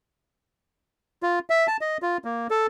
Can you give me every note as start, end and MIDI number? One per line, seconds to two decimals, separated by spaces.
1.23 1.39 65
1.50 1.67 76
1.68 1.77 81
1.81 1.98 75
2.02 2.18 65
2.24 2.47 58
2.51 2.67 69